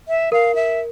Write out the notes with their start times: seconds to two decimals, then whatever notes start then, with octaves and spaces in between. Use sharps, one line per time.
0.08 E5
0.32 A#4 F5
0.55 E5